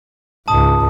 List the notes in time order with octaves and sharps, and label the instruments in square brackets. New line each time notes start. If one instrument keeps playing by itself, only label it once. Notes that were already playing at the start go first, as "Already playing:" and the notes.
[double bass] C#2 G#2 [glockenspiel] A5 D#6